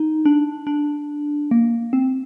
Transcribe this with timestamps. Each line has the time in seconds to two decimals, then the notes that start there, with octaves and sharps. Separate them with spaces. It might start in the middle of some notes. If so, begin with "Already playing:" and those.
Already playing: D#4
0.26 D4
0.67 D4
1.51 A#3
1.93 C4